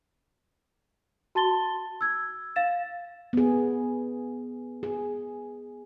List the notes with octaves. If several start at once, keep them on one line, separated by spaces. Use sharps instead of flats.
F#4 A5 C6 A6 G7
E6 G#6
F5 A6 E7
B3 G#4
G#4